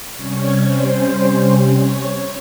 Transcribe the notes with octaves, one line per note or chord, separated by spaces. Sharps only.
C3 G3 C#4 C#5
C5
C#5